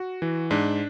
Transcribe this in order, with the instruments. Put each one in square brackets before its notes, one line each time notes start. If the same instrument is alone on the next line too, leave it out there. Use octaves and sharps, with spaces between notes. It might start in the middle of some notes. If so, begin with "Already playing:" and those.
Already playing: [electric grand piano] F#4
E3
G#2 D4